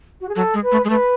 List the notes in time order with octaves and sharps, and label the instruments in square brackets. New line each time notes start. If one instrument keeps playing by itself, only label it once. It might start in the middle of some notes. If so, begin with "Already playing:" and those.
[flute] F#4
G#4
[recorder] F#3 [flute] A4
[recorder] G#3
[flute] B4
[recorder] A3
G#3
[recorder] A3 [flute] B4